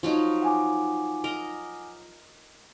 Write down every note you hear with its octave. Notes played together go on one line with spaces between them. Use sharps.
F3 F#3 D#4
F#5 G#5 D6
A#4 D#5